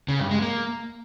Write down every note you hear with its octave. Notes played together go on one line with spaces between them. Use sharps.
C#3
G2
G#3
A#3